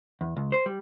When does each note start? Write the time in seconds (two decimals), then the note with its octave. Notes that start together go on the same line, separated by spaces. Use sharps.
0.21 E2
0.37 C#2
0.52 C5
0.66 G3